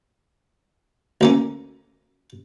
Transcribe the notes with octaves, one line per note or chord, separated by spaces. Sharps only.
D2 A#3 C#4